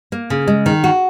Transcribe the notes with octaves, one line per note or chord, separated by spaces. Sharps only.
A#3
C#3
G#3
D#3
F#4